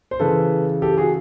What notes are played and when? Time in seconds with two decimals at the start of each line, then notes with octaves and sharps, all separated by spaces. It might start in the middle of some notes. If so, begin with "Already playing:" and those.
0.11 C5
0.20 C#3 E3 A4 B4
0.82 G4 A4
0.98 F#4 G#4